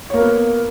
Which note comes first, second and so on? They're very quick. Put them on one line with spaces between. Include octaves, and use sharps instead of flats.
C#5 A#3 A#4 B3